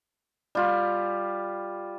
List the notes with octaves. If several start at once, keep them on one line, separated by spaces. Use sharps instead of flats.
G3 F4